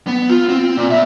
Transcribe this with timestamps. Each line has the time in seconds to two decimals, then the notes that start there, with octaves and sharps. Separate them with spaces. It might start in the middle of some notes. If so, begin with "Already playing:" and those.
0.07 B3
0.30 F4
0.49 C4
0.77 A#2
0.91 B3 E5